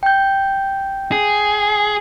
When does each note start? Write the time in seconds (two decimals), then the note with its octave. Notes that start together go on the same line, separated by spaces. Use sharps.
0.03 G5 G6
1.12 G#4